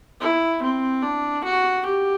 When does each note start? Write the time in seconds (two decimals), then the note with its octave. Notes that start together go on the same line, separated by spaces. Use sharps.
0.20 E4
0.62 C4
1.03 D4
1.44 F#4
1.86 G4